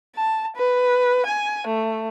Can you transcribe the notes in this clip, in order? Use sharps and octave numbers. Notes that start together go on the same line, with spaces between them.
A5
B4
G#5
A3